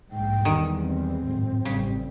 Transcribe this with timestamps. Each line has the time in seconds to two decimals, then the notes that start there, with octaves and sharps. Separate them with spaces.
0.11 A#1 G#2 G5
0.45 E2 D#3 G3 G#3
0.78 C4
1.25 G#1 F#2 A2
1.65 A1 C#3 G3